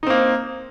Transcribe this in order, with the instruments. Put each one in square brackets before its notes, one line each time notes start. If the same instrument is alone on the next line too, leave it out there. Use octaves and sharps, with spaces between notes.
[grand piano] D#4
C4
A#3